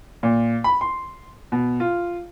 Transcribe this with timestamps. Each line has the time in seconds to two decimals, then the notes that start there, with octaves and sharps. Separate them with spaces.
0.23 A#2
0.64 B5
0.81 C6
1.52 B2
1.80 F4